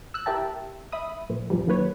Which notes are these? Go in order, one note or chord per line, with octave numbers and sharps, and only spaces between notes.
E6 F#6
E4 G4 A#4 E5 G5 A5
E5 B5 D#6
A#2 F3
C2 F#2 A#2 F3 G3
D#3 F#3 A#3 B4 C#5